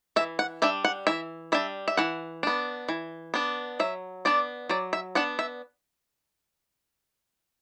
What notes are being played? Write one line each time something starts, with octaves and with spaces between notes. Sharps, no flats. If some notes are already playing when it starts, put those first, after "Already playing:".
E3 E5
F#5
G3 D4 E5
F#5
E3 E5
G3 D4 E5
E5
E3 F#5
B3 D4
E3
B3 D4
F#3 E5
B3 D4 D5
F#3 D5
E5
B3 D4 F#5
E5